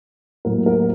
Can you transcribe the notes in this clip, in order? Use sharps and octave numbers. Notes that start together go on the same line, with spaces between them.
A2 F#3 A#3 A#4
A#4